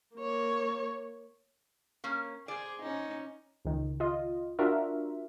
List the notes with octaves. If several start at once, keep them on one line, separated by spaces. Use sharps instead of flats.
A#3 C#5
A#3 C#4
G#4 C5 D5
C#4 D#4
C#2 D#3
F4 D#5
D4 F4 F#4 A#4 E5